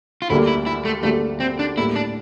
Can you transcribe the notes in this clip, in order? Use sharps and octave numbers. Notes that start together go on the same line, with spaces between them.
F4
D2 D3 G3 A#3 E4
E4
E4
A3
D2 D3 G3 A3 A#3
C4
D4
A2 G3 A#3 E4
D4